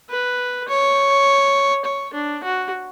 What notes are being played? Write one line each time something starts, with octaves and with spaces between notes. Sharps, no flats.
B4
C#5
C#5
D4
F#4